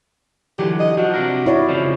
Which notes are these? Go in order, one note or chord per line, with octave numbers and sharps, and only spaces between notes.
D3 E3 F#3 G4
D#5
F3 D4 F#4
C3 D4 A#4
E4 C#5 D5
F2 C#3 F3